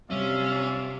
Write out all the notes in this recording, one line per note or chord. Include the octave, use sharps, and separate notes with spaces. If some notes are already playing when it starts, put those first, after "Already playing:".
C3 F#3 G3 C#4 F4 D5 E5